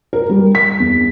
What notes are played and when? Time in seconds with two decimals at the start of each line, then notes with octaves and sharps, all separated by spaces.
0.13 A#4
0.29 G3
0.55 B6
0.80 E2